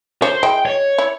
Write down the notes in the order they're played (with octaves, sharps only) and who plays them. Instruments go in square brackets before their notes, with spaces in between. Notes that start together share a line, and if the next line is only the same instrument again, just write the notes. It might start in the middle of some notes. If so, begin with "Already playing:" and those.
[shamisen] D3 C#5 [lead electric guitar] C5
[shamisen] G#3 E4 [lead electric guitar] G5
[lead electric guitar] C#5
[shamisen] E4